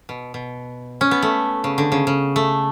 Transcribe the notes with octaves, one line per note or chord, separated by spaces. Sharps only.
B2
B2
C#4
B3
A3
C#3
D3
C#3
C#3
A3